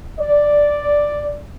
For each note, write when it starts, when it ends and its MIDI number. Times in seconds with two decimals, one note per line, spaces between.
0.20 1.40 74